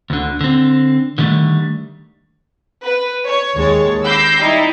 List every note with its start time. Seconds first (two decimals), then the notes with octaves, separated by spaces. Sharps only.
0.10 D2 D3
0.41 D3 C4
1.18 D3 D#3 F3 G3 A3
2.84 B4
3.24 C#5
3.54 D#2 G#3 C#5 A5
4.04 B5 D6 E6 G6 A#6 C7
4.40 G3 D#4 E4